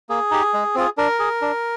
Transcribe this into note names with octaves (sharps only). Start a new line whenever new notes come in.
A#3 G#4
D#4 G4
G#3
C4 F4 G#4
D4 A#4
G#4
D4